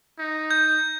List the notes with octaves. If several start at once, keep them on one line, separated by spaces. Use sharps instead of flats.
D#4
G6